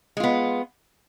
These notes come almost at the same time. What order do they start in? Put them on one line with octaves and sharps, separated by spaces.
G#3 F4 B3